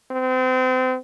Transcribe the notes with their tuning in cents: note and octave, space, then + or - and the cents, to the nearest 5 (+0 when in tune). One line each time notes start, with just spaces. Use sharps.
C4 -35